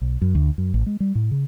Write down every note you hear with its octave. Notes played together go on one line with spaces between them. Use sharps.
B1
F#2
D2
F#2
A1
G#3
G3
A2
C#3